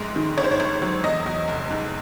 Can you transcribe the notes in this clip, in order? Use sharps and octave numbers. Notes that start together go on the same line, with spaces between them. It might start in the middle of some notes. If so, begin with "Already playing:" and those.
Already playing: A#1 G#2 G#3
D#3
G1 C#5
C5
C#5
G1
F#3
E2 D#5
E2
F1
G#2